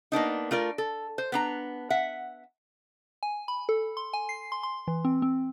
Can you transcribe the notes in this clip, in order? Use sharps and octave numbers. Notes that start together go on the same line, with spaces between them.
A#3 B3 D4 D#4
A3 F4 A#4 D5
A4
C5
B3 D4 A#5
E5 F#5
G#5
B5
A4
C6
G#5
C7
C6
C6
E3
C4
C4